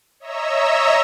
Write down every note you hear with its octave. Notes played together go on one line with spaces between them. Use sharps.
C#5 D#5 E5 A#5 E6